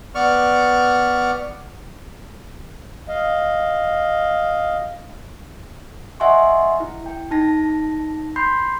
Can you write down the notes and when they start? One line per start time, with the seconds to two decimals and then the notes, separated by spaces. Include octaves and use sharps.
0.15 B3 D5 C#6 F6
3.08 D#5 F5
6.20 D#5 E5 F#5 G#5 C6 C#6
6.80 E4
7.06 G5
7.31 D#4 A5 A#6
8.36 B5 C6 G6 C7